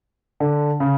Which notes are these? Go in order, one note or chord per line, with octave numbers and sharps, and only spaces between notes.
D3
C#3